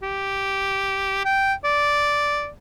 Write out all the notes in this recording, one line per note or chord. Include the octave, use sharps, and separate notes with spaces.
G4
G5
D5